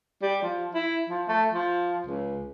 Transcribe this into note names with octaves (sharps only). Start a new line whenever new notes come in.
G3
F3
E4
F3
A3
F3
C#2